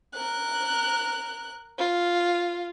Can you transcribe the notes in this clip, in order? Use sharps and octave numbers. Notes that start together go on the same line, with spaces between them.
A#4 F#6
F4